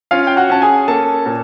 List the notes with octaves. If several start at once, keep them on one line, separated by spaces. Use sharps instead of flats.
C#4 F4 F5
G5
F#4 F#5
C#4 A5
G#4 G#5
A#3 A4 A5
A#2